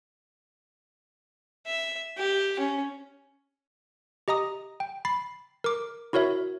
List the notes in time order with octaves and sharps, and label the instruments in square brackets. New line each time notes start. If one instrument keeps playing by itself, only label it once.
[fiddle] E5
G4
C#4
[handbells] G4 D#5 A#5 D#6
G5
B5 A6 C7
A#4 D6
E4 F#4 A#4 C#5 E5